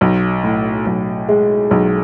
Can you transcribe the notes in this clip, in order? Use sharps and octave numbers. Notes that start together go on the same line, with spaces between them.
B1
A2
B1
G#3
B1